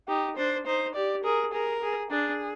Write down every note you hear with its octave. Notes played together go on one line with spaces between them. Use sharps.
D#4 G4
D4 C5
D#4 C5
G4 D5
G#4 A#4
G#4 A#4
G#4
D4 G#4